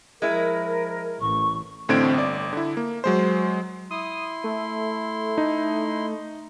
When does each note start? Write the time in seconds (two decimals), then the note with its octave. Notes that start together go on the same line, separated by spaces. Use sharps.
0.22 F3 G#3 E4 A#4
1.21 A1 C#6
1.89 A1 A2 D3 C4 G#6 D7
2.14 G1 D5
2.53 D3 E4
2.77 A#3
3.04 F#3 G#3 C5
3.91 E4 C6 D#6
4.44 A3
5.38 D#4